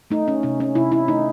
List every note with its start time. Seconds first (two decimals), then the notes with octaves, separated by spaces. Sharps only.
0.11 A3 D#4
0.28 C#4
0.43 C3 C#4
0.60 C#4
0.75 C3 E4
0.92 E4
1.08 A3 D#4